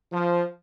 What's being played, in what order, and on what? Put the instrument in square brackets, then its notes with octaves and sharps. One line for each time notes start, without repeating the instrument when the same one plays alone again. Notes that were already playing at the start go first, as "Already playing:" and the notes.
[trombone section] F3